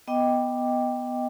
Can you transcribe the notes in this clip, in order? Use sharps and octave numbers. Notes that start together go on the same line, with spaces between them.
B3 D#5 G5 D6